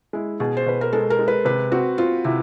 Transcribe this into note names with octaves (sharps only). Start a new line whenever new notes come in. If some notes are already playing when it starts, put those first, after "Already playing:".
G#3 E4
B2 G#4
C5
B2 B4
A#4
G#3 A4
A#4
G#3
B4
C3 B4
C4 F#4
C4 F4
C3 E4